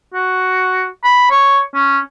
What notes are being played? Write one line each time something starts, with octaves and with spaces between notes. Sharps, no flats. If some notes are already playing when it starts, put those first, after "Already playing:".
F#4
B5
C#5
C#4